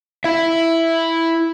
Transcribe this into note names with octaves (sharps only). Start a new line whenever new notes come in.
E4 E5